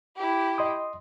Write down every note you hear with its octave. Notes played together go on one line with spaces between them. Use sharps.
E4 G4
D#5 C6 D#6